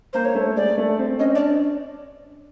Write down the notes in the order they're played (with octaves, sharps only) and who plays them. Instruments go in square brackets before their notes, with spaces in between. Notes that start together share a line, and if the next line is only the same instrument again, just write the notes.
[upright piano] A#3 [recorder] C5
[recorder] C#5
[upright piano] A3
[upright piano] G#3 [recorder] D5
[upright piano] A3
C4
[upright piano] C#4 [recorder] D#5
[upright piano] D4 [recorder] D5